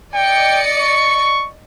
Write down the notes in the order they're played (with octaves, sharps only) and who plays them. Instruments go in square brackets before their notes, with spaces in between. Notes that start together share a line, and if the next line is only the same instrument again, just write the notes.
[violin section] D5 D#5 C#7 [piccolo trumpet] G5
[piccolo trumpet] C#6